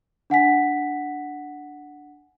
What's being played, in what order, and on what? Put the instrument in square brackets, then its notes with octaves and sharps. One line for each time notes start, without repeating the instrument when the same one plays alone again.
[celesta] D4 F#5 G#5 B6